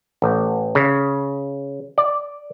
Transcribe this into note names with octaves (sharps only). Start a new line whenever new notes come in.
A1
C#3
D5